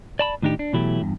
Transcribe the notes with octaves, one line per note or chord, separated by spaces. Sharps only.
D5 A5 B5
A2 D#3 D4 D#4 G4
D4
B2 E3 F#3 A3 E4 G4
E2 G2